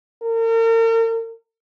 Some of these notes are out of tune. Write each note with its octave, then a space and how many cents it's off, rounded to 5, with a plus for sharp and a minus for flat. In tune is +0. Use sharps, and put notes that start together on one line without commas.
A#4 -40